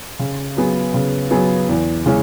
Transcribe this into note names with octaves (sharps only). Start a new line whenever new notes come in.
C#3
F#3 B3 G#4
C#3
F#3 B3 G#4
E2
C#3 E3 G#3 C#4